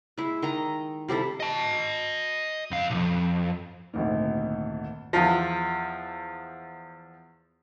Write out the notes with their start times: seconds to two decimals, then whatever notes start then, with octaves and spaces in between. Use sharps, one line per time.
0.18 G#3 E4
0.42 D#3 D#5 A#5
1.08 C3 G3 E4 A4
1.40 D#5 A5
2.71 F2 F5
2.90 B1 F2
3.93 G#1 D2 A#2
5.13 E2 F3